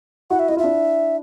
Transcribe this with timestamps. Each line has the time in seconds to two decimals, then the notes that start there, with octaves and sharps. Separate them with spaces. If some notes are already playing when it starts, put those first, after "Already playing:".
0.30 E4 F#4 F#5
0.39 E5
0.49 E4 D#5
0.57 F4 E5
0.64 D4 E4